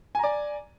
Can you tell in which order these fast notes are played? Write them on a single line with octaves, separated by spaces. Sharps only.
G#5 A#5 D5